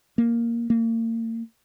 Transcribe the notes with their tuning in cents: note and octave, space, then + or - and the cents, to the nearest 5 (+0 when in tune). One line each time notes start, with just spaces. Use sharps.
A#3 +0
A#3 -40